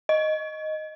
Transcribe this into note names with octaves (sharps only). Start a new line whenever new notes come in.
D#5